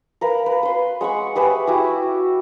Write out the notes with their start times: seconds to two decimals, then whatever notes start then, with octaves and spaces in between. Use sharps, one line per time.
0.21 A#4 B4 F5
0.46 B4
0.63 B4 C6
1.01 G#3 F#5 B5 C#6
1.35 G4 G#4 B4 E5
1.67 E4 F#4 G4